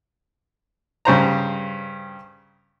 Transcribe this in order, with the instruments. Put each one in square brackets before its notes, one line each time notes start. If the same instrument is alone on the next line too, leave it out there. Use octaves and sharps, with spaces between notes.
[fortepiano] G2 C#3 C5 A#5